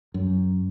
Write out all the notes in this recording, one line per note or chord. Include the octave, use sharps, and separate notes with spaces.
F#2